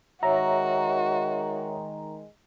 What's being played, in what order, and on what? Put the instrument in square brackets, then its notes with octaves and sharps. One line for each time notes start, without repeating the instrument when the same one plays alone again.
[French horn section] D#3 G#3 [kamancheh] F#4 [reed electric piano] C#5 E5 [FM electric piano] A#5